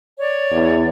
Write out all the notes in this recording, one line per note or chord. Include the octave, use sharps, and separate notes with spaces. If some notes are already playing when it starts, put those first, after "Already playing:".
C#5 D5
E2